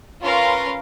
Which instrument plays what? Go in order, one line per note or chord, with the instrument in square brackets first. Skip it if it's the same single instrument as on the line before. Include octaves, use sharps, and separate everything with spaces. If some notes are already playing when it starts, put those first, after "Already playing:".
[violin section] C#4 F4 A#4 B4 F5 C6